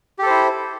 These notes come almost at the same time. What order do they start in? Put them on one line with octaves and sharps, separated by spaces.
G4 A4 C5 E4